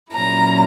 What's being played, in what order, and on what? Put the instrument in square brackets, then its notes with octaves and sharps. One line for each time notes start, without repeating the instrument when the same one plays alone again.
[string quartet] A#2 F#3 C#4 E4 A#5